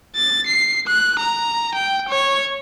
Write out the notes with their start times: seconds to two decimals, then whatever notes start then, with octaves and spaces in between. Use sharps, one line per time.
0.16 A6
0.47 C7
0.87 F#6
1.19 A#5
1.75 G5
2.09 C#5